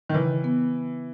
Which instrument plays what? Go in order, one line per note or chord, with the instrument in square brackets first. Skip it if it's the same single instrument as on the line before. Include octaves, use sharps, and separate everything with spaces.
[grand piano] D#3
[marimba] C#3 [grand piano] E3
[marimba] B3